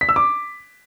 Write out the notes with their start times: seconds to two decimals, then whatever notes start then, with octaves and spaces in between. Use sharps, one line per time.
0.01 B6
0.09 E6
0.16 D6